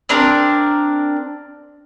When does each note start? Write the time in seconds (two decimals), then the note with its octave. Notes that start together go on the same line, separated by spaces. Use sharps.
0.09 C4 D4 A#4